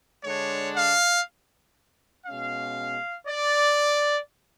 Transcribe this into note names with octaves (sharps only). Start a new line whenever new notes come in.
D3 G#3 D4 C#5
F5
B2 G#3 C#4 F5
D5